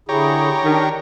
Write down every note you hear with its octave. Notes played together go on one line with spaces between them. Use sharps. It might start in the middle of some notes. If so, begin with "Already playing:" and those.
D3 E4 G4 G#4 C#5 A#5
D#3 D4